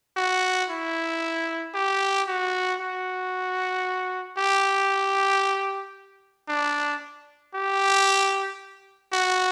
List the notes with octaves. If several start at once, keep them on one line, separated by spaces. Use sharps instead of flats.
F#4
E4
G4
F#4
F#4
G4
D4
G4
F#4